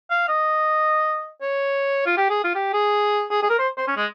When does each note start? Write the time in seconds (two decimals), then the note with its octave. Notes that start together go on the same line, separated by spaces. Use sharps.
0.10 F5
0.29 D#5
1.41 C#5
2.06 F4
2.17 G4
2.30 G#4
2.44 F4
2.55 G4
2.74 G#4
3.31 G#4
3.43 G#4
3.50 A#4
3.59 C5
3.78 C5
3.87 C#4
3.97 G#3